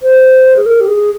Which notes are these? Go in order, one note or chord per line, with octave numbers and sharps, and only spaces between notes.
C5
G#4
A#4
G4
G#4